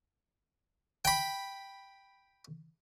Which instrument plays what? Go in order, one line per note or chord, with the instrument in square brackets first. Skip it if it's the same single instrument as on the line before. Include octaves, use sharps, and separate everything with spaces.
[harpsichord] G5 B5